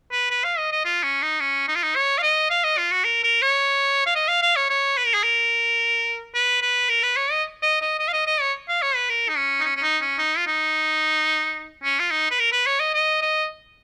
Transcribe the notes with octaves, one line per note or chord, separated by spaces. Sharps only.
B4
B4
F5
D#5
D#5
F4
C#4
D#4
C#4
D#4
F4
D#4
C#5
F5
D#5
F5
D#5
F4
F#4
A#4
A#4
C#5
F5
D#5
F5
F5
C#5
C#5
B4
A#4
G#4
A#4
B4
B4
A#4
B4
C#5
D#5
D#5
D#5
D#5
F5
D#5
D#5
C#5
F5
C#5
B4
A#4
D#4
C#4
D#4
C#4
C#4
D#4
C#4
D#4
F4
D#4
C#4
F4
D#4
B4
A#4
B4
C#5
D#5
D#5
D#5